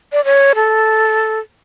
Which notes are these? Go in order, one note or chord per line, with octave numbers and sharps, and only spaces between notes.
D5
C#5
A4